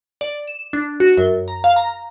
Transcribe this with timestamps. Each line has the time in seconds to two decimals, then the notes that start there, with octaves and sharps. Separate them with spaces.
0.21 D5
0.47 E7
0.73 D4
1.00 F#4
1.17 F#2
1.48 A#5
1.64 F5
1.76 A#5